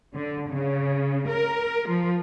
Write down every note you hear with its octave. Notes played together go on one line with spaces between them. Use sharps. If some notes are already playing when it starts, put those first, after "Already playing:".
D3
C#3
A#4
F3